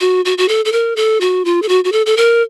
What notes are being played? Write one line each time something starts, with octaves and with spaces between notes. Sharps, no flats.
F#4
F#4
F#4
A4
A4
A#4
A4
F#4
F4
A4
F#4
F#4
A4
A4
A#4